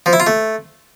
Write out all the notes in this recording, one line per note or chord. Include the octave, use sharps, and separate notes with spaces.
F3
E4
F4
A3